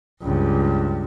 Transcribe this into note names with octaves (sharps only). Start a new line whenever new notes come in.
C#2 G2